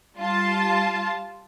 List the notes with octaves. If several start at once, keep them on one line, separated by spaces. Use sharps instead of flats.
G3 F4 A5